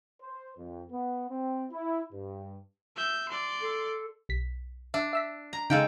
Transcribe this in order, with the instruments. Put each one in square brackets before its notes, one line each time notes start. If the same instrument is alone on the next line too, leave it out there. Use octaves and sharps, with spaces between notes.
[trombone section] C5
F2
B3
C4
E4
G2
[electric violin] E5 G6
D5 C6
[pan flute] A4
[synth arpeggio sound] B1 B6
[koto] D4 [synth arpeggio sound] E5
[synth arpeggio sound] E5 E6 B6
[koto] A#5
[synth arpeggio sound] C#3 D#4 F5 [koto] G#3 A4 G5